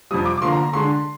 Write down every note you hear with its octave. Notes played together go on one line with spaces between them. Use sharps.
F2 C3 G3 D#6
D6
D6
D3 F3 A#3 C6
A#5
A#5
D3 G#3 D4 C6